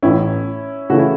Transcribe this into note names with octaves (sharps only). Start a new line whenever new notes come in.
A1 A2 E3 B3 C#4 D#4 E4
C#3 E3 A3 C#4 F#4
E4